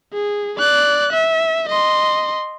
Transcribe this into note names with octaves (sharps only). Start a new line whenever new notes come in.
G#4
D5 F#6
E5
D#5 C6